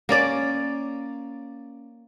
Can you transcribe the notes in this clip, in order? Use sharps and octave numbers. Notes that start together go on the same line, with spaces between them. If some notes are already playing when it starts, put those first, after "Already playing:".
A#3 C#4 D5